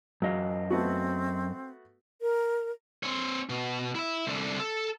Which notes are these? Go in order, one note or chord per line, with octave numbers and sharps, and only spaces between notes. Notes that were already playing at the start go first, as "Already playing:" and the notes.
F#2 F#3 D#5 F5
A3 B3 C4 F#4
A#4
C4 C#5
B2
E4 E5
C2 D3
A4